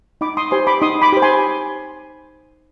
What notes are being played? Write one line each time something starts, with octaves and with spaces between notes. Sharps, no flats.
D#4 B5 D6
C6 D#6
G4 C5 G#5 C6
B5 D6
D#4 C6 D#6
B5 D6
G4 C5
G#5 C6